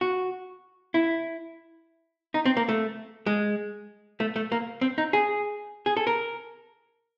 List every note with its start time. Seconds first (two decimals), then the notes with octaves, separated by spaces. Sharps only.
0.01 F#4
0.94 E4
2.34 D#4
2.46 C4
2.57 A#3
2.69 A3
3.26 G#3
4.20 A3
4.36 A3
4.52 A#3
4.81 C4
4.98 D#4
5.13 G#4
5.86 G#4
5.97 A4
6.07 A#4